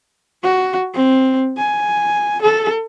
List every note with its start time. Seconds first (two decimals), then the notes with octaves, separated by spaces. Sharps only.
0.43 F#4
0.94 C4
1.57 G#5
2.42 A4